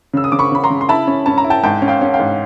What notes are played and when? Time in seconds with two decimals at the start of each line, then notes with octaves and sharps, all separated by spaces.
0.14 C#3 E6
0.24 D#6
0.32 C#3 D6
0.39 B5 C#6
0.52 C#3 B5
0.63 A#5 C6
0.70 C#3
0.81 C6
0.89 E4 A5 B5
1.07 C#4
1.26 C#4 A5
1.38 A#5
1.44 E4
1.50 G5 A5
1.63 G#2 G5 A5
1.82 C#4
1.88 F5 G5
2.01 C#4
2.14 F5 G5
2.19 G#2